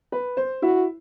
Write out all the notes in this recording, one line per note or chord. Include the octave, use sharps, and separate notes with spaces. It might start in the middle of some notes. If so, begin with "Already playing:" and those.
B4
C5
E4 F#4